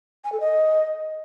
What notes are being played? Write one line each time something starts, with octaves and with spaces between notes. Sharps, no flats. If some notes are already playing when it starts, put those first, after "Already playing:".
G#5
A4
D#5